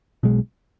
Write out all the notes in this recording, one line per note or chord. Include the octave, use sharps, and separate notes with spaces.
B1 B2 G#3